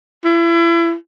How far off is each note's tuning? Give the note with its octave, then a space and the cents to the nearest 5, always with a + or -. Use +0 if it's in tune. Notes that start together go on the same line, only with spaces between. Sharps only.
E4 +35